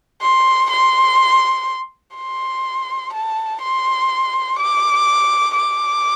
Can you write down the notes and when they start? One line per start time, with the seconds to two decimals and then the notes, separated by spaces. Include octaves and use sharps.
0.22 C6
0.70 C6
2.16 C6
3.13 A5
3.62 C6
4.59 D6
5.56 D6